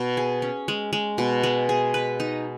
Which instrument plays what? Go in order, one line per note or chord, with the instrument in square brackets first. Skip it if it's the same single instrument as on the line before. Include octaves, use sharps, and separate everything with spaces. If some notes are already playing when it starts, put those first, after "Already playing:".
Already playing: [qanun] B2
G#4
C#4
G#3
G#3
B2
G#3
G#4
B4
D#4